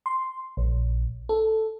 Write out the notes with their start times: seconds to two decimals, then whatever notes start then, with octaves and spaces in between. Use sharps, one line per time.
0.06 C6
0.57 A#1
1.29 A4